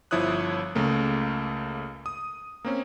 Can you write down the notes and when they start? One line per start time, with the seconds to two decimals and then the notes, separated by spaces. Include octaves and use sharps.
0.11 G1 F3 E4 C#5 D#6 F#6
0.75 C#2 C#3 A3 A#3
2.06 D#6
2.65 A#3 C4 C#4